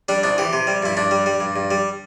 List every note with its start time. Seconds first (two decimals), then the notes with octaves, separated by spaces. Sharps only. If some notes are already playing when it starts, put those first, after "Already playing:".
0.09 G3 D4
0.23 C2 D4
0.38 E3 G4
0.53 C3
0.67 G3
0.83 G2 E4
0.97 G2 D4
1.11 G3
1.26 G3
1.40 G2
1.56 G2
1.71 G3